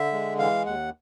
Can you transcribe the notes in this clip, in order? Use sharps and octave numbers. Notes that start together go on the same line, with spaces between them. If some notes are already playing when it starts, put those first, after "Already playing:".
Already playing: D3 E5
G#3
E3 F5
D#2 F#5